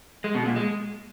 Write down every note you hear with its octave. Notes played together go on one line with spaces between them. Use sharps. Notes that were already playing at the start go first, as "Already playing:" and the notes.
G#3
B2
A#2
G#3